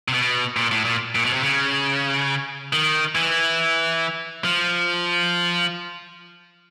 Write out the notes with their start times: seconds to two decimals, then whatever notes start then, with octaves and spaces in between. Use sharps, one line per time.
0.08 C3
0.14 B2
0.57 A#2
0.71 A2
0.85 A#2
1.15 A#2
1.25 B2
1.33 C3
1.43 C#3
2.73 D#3
3.15 E3
4.44 F3